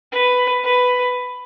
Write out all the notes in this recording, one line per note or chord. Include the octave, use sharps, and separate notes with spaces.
B4
B4